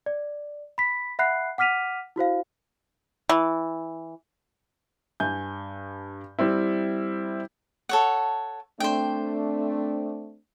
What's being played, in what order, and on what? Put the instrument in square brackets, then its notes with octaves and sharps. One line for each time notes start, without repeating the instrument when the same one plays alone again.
[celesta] D5
B5 B6
E5 F#5 B5 F#6 C7
F#5 D6 F6 B6 D#7 F7
E4 F#4 C5 F5
[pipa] E3
[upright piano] G2 G#5 G6
G3 C4 E4
[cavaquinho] A4 C#5 F#5
[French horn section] A3 C4 D4 [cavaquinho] C5 G5